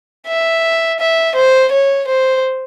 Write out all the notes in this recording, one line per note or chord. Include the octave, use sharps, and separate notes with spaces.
E5
E5
C5
C#5
C5